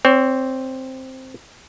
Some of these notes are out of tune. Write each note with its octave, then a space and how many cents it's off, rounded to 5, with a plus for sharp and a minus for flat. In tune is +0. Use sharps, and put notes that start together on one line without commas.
C4 +0 C#5 +30